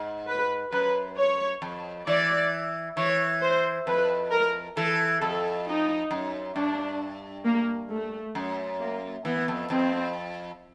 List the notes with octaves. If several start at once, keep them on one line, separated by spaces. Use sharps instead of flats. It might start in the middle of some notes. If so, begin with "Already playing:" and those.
Already playing: G#2
B4
F#2 B4
C#5
F2
E3 D5
E3 C#5
C5
F2 B4
A#4
E3 A4
F2 A4
D#4
F#2
G2 D4
A#3
A3
F#2
A#3
E3 B3
F2
F2 C4